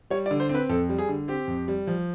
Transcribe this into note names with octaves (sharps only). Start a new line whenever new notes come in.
G3 C#5
D5
D3
C5
C4
B4
F2 A4
G3
G#4
D3
C4 G4
F2
G3
F3